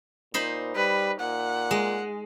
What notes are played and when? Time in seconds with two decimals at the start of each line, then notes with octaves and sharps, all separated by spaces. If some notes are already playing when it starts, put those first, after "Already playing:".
0.34 A#2 D#4 C5 B5
0.76 G3 B4
1.20 A#2 F#5
1.71 G#3